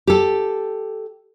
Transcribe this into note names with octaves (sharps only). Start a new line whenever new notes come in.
G4 A4